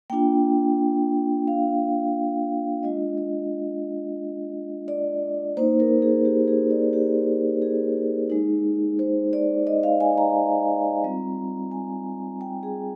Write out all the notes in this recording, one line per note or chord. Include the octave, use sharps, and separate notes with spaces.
A#3 D4 F4 G5
F5
G#3 D4 F4 D#5
D#5
D5
A#3 D#4 C5
A#4
G#4
G4
G#4
D5
G4
G#4
G#3 D#4
C5
D5
D#5
F5
G#5
A#5
G3 C4 F4
G#5
G5
G#4